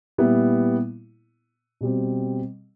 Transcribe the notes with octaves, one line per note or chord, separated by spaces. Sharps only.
A#2 G3 B3 E4
B2 G3 C4